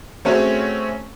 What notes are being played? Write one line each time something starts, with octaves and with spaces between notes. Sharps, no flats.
A3 C4 C#4 F#4 G#4 C#5